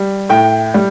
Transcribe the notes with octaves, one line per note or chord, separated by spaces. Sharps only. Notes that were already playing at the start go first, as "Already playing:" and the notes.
Already playing: G3
A2 G5
G3